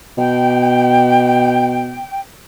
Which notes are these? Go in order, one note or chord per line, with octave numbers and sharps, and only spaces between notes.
B2 G5